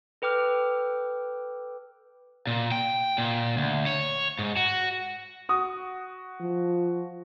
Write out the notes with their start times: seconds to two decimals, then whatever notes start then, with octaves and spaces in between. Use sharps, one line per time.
0.22 A4 B4 G5 D6 F6
2.47 A#2
2.72 G5
3.18 A#2
3.57 D2
3.86 C#5
4.39 G#2
4.57 F#4
5.49 F#4 D#6
6.40 F3